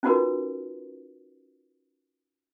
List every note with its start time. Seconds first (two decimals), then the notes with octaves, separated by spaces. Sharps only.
0.03 C#4 D#4 F4 F#4 A#4 B4